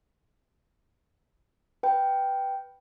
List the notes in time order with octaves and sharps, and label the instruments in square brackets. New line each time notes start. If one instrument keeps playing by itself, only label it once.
[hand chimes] B4 G5